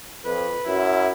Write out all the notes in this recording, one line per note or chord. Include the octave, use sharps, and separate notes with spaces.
F2 B4
F#2 E4